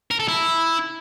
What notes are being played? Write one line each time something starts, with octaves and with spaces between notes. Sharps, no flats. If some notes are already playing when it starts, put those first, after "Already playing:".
A#4
A4
E4